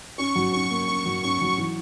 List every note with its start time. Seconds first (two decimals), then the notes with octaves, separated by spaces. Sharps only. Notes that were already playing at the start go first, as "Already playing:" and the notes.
0.18 C#4 C#6
0.35 F#3
0.53 C#4 C#6
0.70 A#3
0.88 C#4 C#6
1.06 F#3
1.23 C#4 C#6
1.41 F#3
1.58 E3